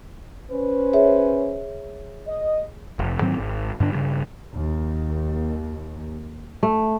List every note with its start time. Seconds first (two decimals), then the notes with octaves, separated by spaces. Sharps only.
0.50 C#4 B4 C5
0.93 G#4 C#5 E5
2.27 D#5
2.99 F1
3.21 G#2 D#3 F#3 C4
3.39 G#1
3.80 G2 D3 D4
3.92 G2 C#3
4.54 D#2
6.63 A3